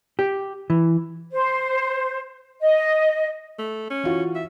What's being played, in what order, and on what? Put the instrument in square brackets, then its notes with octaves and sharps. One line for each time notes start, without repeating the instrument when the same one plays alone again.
[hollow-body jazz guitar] G4
E3
[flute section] C5
D#5
[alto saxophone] A3
C#4
[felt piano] E3 F4 F#4
[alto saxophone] E5